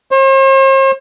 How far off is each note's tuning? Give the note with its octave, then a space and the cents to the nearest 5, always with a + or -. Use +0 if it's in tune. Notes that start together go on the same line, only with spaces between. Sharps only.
C5 +45